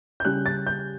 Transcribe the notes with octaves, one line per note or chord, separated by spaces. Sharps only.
G6
C#3 G3 C#4 F#6
A6
G6